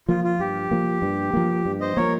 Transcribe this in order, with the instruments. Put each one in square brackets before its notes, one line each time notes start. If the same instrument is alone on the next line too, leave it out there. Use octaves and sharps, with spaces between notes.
[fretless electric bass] F3 A#3 [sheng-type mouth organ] F4
[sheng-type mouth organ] F4
[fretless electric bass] G2 [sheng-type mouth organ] G4
[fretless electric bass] F3 A#3
G2
F3 A#3
G2
[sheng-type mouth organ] C5 D#5
[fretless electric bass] F3 A#3 [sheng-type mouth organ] A#4 C#5